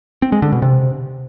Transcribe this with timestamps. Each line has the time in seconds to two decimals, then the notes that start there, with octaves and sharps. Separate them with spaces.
0.22 C4
0.32 G#3
0.42 D3
0.52 B2
0.62 C3